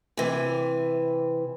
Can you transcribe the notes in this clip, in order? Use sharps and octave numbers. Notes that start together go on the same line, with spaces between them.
C3 E3